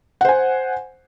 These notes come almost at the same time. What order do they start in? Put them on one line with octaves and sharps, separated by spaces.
F#5 C5 G#5